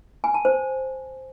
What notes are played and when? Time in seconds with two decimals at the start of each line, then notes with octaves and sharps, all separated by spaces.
0.24 G#5
0.34 A5
0.45 C5